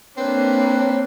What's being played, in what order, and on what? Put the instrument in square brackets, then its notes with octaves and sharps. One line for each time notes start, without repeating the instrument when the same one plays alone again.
[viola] A#3 D4 [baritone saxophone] C4 [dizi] B4 [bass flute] C#5